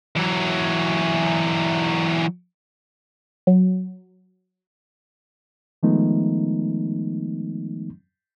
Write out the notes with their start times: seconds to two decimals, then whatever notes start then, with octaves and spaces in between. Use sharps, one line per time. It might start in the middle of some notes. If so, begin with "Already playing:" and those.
0.16 E3 F#3
3.47 F#3
5.83 D#3 F3 G#3 A3 B3 D#4